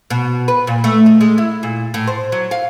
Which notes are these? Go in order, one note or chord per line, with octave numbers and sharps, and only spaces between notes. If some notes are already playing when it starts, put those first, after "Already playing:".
B2
B4
A#2
A3
D#4
G#3
E4
A#2
A2
C5
F#3
F5